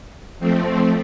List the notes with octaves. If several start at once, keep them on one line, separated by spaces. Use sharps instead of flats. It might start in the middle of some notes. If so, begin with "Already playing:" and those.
F2 F3 A3 C4